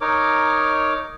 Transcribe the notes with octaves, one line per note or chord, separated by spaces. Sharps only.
D#4 A#4 C#5 D6